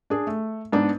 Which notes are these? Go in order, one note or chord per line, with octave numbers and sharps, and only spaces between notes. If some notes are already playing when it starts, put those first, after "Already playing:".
D4 G#4
A3
G#2 B3 D4